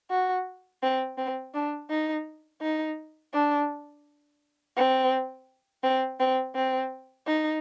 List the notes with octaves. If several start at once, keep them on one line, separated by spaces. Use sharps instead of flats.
F#4
C4
C4
D4
D#4
D#4
D4
C4
C4
C4
C4
D#4